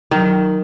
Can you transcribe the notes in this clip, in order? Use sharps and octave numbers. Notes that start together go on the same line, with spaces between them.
D#3 F#3